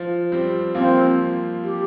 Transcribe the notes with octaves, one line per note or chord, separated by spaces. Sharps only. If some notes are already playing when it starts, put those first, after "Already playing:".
Already playing: F3
G3 C4
F3 A#3 C4
G4